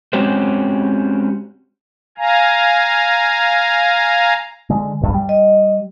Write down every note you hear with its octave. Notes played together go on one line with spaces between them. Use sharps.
G#3 C4 C#4 F#4 G4 C5
F5 G#5 A#5
D3 G#3
D1 A#1 G2
G3
D#5